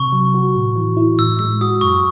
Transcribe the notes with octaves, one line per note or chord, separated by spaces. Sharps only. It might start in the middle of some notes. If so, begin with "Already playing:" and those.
Already playing: C3 C#6
F#3
F#4
A2
E3
E4
A2 E6
G#3 E6
F#4 D#6
F#2 C#6